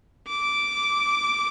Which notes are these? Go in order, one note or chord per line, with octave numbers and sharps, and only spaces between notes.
D6